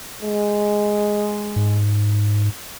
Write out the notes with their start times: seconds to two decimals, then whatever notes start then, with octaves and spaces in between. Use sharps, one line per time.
0.22 G#3
1.56 G#2